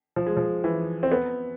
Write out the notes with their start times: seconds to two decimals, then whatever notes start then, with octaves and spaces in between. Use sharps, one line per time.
0.16 F3
0.26 G#3
0.37 F3
0.64 E3
1.03 C4
1.12 B3